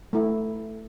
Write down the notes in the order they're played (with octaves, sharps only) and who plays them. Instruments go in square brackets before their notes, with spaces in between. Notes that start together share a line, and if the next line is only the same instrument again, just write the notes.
[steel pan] A3 E4